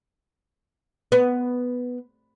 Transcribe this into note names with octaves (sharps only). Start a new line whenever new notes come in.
B3